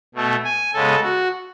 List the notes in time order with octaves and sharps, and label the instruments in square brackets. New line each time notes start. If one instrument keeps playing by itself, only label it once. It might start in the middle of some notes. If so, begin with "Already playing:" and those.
[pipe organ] B2 A3
G#5
C#3 G#3 B3 A4
F#4